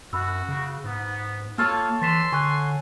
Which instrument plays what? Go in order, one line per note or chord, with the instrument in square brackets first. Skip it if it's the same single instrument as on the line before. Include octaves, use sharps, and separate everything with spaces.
[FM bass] F#2 [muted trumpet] F#4 [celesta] B5 E6
[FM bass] C#3
[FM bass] G#2 [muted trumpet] B3
[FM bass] A#3 [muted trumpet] F4 [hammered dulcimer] A4 C#5 [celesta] F6
[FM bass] E3 [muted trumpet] C6 [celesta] A6 B6 E7
[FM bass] D3 [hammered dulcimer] G#5 [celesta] C#6 F#6